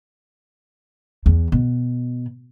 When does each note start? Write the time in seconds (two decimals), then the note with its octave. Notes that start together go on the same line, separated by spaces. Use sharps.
1.26 E2
1.52 B2